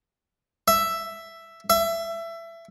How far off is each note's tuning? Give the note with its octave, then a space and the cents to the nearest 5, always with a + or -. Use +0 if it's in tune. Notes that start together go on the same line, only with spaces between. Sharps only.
E5 +5
E5 +20